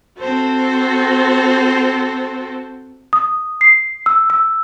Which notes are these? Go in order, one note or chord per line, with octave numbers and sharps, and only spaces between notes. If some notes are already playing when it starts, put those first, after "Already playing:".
C4 F#4 A4 C5
D#6
C7
E6
E6